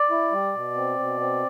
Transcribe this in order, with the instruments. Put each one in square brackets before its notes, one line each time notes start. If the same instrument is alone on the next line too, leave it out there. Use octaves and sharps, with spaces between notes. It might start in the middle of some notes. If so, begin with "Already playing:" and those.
Already playing: [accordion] D5
E4
G3
B2
C4
B2
C4